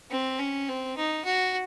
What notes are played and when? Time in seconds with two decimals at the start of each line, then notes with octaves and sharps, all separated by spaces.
0.11 C4
0.39 C#4
0.69 C4
0.97 D#4
1.25 F#4